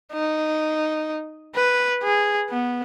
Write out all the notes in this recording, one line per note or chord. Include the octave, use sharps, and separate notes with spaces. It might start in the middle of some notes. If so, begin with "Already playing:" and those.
D#4
B4
G#4
B3